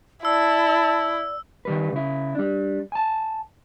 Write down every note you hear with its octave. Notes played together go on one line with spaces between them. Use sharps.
E4 D5 A5 E6
D#3 G3 B4
C#3 E4
G3 D4
G#5 A5